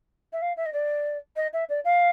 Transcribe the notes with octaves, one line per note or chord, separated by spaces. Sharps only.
E5
F5
E5
D#5
D5
D#5
E5
D5
F5